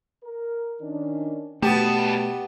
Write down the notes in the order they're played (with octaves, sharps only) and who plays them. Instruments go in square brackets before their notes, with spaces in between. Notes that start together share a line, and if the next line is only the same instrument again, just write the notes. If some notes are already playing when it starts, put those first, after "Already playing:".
[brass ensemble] A#4
D#3 C#4 D4
[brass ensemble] B2 [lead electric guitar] G3 A5 [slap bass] A3 [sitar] B3 G4